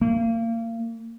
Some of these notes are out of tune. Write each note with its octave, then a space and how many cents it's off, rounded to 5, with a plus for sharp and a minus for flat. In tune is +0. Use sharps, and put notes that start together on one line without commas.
A#3 -30